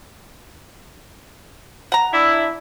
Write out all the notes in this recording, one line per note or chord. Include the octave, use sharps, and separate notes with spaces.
F#5 A#5
D4 E4